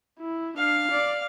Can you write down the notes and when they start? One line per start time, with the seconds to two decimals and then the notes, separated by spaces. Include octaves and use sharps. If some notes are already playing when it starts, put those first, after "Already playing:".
0.19 E4
0.57 D4 F5
0.91 D5